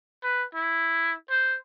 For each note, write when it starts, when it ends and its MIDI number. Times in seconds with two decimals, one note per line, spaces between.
0.23 0.43 71
0.55 1.14 64
1.30 1.57 72